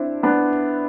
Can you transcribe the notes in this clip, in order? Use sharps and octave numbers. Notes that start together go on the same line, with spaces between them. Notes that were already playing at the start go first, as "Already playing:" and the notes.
Already playing: C4 D4 E4
B3 D4